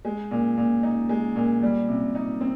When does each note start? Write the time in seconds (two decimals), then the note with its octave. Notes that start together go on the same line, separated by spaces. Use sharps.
0.05 G#3
0.31 A#2
0.57 A#2
0.83 D#4
1.09 G#3
1.36 A#2
1.63 G3
1.88 C3
2.15 D#4
2.41 C4